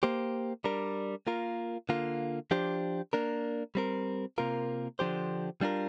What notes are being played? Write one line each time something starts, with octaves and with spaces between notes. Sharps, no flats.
A#3 G4 C5
G3 D4 A#4
A#3 F4 A#4
D3 A#3 F4
F3 D4 G4 C5
A#3 D4 A#4
G3 C4 A#4
C3 A#3 F4 A#4
D3 F3 D4 G4 C5
G3 D4 F4 A#4